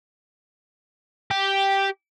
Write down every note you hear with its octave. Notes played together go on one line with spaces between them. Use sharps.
G4